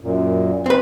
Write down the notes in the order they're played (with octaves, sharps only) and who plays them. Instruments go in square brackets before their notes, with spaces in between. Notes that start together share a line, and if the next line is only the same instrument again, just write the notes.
[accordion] F#2 A#2
[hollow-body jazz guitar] C4 B4